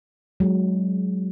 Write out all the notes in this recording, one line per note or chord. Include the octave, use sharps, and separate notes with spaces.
F#3 G#3